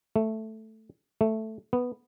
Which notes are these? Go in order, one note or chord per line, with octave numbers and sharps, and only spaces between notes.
A3
A3
B3